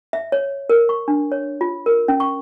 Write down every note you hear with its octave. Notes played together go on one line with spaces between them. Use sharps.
E5
C#5
A#4
C#6
D4
C#5
F4
A#4
C#4
C#6